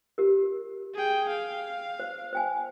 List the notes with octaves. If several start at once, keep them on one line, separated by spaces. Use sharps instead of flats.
G4 A#4
G#4 G5
F5
C5
C5 G5 G#5